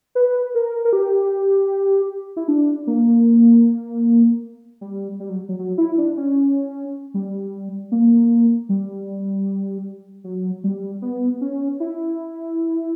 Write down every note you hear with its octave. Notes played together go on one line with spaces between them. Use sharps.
B4
A#4
A#4
G4
E4
D4
A#3
G3
G3
F#3
F#3
F#3
E4
D4
C#4
G3
A#3
G3
F#3
G3
B3
C#4
E4